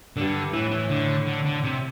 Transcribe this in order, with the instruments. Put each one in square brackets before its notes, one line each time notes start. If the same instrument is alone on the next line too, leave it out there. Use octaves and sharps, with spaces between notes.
[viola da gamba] G2 [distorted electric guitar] D3
[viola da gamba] A2 [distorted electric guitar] E3
[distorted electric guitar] E3
D3
D3
D3
C3